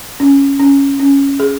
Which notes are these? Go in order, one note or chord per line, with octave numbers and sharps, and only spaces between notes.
C#4
C#4
C#4
G#4